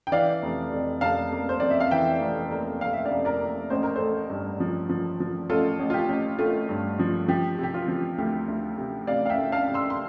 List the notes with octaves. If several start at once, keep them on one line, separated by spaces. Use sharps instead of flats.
G5
E3 D5 F5
F1
F2
F1 F5 A5
A#3
C5
F2 D5
E5
F5
E3 E5 G5
F1
A#3
F1 F5
E5
D5 F5
F1
A#4 D5
A#3
A1 C5
A#4
A3 A4 C5
G2
F3
F3
F3
A1 F4 A4
A1
F4
G4
A1
A3 F4
G2
F3
F3 G4
C3 G4
F4
F3
D2 G4
D2
C3
C3 D5 F5
F5
E5 G5
D2
F5 A5
C3
C6 E6
C6